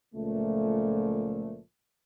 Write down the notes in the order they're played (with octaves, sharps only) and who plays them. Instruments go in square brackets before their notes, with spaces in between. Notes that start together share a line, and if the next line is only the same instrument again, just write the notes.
[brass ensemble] C#2 A#2 F3 A3